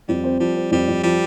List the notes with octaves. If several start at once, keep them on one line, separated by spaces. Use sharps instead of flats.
F2 G3
C4
F3 G3
C4
F2 G3
F2
F3 G3